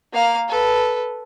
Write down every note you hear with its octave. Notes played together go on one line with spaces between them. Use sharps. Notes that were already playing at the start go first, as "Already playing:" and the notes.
A#3 F5
A4 B4